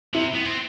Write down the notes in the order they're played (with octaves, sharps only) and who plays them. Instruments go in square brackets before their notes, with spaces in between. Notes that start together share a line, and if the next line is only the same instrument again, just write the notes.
[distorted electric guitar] C3 [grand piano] E4
[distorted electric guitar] B3
C4